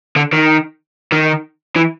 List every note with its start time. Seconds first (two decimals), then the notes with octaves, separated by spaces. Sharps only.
0.16 D3
0.33 D#3
1.12 D#3
1.76 E3